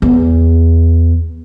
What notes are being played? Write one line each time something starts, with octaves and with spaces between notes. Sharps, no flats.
E2